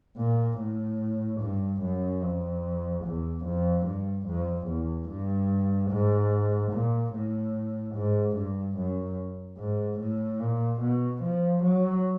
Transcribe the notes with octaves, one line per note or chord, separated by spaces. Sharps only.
A#2
A2
G2
F#2
F2
E2
F2
G2
F2
E2
G2
G#2
A#2
A2
G#2
G2
F#2
G#2
A2
A#2
B2
F3
F#3